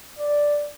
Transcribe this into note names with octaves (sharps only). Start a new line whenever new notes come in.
D5